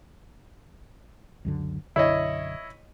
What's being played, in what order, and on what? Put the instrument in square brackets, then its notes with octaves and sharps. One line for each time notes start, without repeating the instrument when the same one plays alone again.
[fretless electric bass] C#2 F#2 D3
[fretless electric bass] B1 F#2 D3 [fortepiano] E4 C#5 D#5